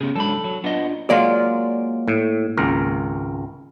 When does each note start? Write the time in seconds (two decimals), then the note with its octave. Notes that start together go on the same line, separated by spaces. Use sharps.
0.01 C#3 B3 G4 G#4
0.16 F#3 G#3 D4 A4 B5
0.44 F#3
0.64 B3 D4 F4 D#5
1.10 F#3 G#3 A#3 F4 D5
2.08 A2
2.57 G#1 C#2 A#4